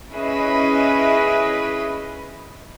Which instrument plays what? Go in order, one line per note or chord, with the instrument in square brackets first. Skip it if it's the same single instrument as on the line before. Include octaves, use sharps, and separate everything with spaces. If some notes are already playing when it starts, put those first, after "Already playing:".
[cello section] C#4 E4 G#4 B4 D#5